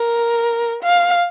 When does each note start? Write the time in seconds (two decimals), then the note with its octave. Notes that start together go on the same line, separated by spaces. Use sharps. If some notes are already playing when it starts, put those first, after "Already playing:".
Already playing: A#4
0.83 F5